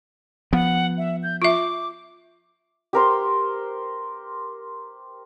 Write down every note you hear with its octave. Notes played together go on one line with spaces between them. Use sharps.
F3 B3 F#5
E5
G6
F4 E5 D6
G4 A#4 C5